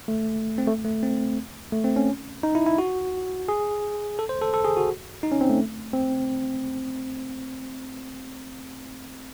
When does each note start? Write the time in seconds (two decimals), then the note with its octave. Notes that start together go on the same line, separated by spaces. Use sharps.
0.08 A3
0.58 C4
0.67 A3
0.85 A3
1.03 C4
1.72 A3
1.84 C4
1.96 C#4
2.43 D#4
2.55 E4
2.66 E4
2.78 F#4
3.49 G#4
4.19 A4
4.29 C5
4.41 A4
4.54 A4
4.65 G#4
4.77 F#4
5.23 D#4
5.32 C#4
5.41 C4
5.50 A3
5.94 C4